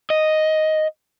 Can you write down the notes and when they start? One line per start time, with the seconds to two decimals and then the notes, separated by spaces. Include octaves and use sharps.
0.10 D#5